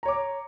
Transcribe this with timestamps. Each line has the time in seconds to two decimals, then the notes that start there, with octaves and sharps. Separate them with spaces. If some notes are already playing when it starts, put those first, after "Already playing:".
0.03 A#5
0.06 C#5
0.08 D6